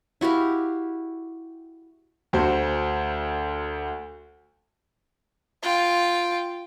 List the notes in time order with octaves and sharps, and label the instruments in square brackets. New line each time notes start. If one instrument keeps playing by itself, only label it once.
[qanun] E4 F#4 G4 F5
[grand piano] D2 F#4 C5
[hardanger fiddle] F4 G5